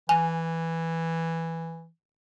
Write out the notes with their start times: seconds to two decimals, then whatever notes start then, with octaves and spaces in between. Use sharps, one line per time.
0.09 E3 G#5